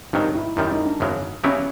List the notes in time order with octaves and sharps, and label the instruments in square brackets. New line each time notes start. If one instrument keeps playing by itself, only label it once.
[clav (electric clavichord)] G#1 G2 D#3 F#3 [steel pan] D#4
[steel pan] E4
[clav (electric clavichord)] F#2 D#3 G3 [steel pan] E4
[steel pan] D#4
D4
[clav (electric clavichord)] G#1 F#2 C#3 F#3
[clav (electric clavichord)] C#3 F#3 B3 E4 G4 [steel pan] C#4